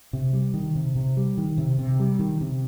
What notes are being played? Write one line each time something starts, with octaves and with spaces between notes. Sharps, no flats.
C3
G3
D#3
C3
C3
G3
D#3
C3
C3
G3
D#3
C3